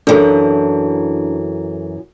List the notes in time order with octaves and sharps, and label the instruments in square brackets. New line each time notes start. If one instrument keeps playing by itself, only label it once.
[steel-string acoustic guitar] F#2 E3 [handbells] D4 [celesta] A4